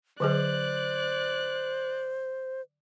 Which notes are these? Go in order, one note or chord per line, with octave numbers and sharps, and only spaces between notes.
D3 F#3 G#4 C5 D5 F#6